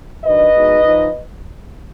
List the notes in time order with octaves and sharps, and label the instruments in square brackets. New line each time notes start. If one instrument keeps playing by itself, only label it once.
[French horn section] D#3 F#3 D4 B4 D#5
B2 G#3 D#4
F3 D#4